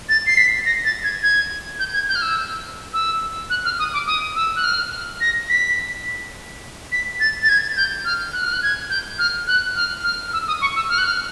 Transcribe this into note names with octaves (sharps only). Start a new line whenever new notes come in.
A6
C7
B6
A#6
A6
G#6
G#6
G6
G#6
G6
F6
E6
E6
F#6
F6
D#6
D6
D#6
E6
F#6
F6
A#6
B6
B6
A6
A6
G#6
G6
F6
F#6
F6
F#6
G#6
G6
F6
F#6
F6
F6
E6
D#6
C#6
E6
F6
F#6
F6